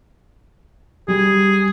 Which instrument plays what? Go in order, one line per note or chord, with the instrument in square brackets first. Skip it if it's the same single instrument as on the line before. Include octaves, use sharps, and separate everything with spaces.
[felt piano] G3 [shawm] G#4